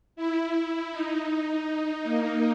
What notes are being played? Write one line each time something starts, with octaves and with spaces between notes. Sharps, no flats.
E4
E4
D#4
A#3